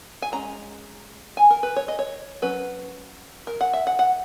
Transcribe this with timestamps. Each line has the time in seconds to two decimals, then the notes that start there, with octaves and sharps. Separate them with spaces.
0.22 G#5
0.32 G#3 C#4 A#5
1.37 G#5
1.50 A#4
1.63 B4
1.76 C#5
1.88 D#5
1.99 C#5
2.42 F#3 C#4 B4
3.47 A#4
3.61 F#5
3.73 E5
3.87 F#5
3.99 F#5